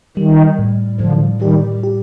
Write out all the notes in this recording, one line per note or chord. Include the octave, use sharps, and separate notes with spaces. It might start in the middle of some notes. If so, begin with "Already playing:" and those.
D#3 G3
A2
A2 D3 F3
D#3 G3 G4
G4